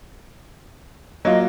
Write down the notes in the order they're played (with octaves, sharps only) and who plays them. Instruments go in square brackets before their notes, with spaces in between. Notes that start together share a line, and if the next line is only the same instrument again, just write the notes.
[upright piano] F#3 A#3 F4 [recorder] D#5